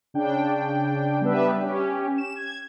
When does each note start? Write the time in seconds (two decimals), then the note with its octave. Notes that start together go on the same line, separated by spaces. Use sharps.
0.14 C#3 D4 G5
1.21 G3 B3 D4 G4 B4 E5
1.61 C#4 G4
2.18 E7
2.36 G#6